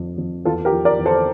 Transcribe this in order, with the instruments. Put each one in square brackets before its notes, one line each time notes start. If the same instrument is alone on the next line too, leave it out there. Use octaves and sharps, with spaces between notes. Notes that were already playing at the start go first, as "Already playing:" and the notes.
Already playing: [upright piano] F2
F2
E2 F4 A4
G4 A#4
F3
A#4 D5
E2
A4 C5